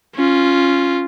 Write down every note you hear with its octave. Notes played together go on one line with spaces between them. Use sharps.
C#4 F4